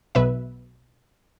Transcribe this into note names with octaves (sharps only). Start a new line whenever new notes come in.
B1 B2 B3 B4 E5